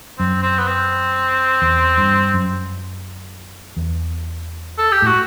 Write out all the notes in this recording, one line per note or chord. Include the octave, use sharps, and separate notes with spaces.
F#2 C4
C4
B3
C4
E2
G2
F#2
E2
A4
G4
A2
F#4